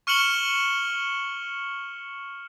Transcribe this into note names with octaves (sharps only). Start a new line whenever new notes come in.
C#6 F6 C#7 E7 F#7 G7